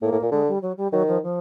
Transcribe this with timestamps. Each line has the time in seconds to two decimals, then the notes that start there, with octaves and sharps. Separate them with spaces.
0.01 A2 A#3
0.12 A2
0.22 A#2
0.31 D3 G#3
0.48 G3
0.62 F#3
0.77 G3
0.92 D#3 F#3
1.07 F3
1.22 F3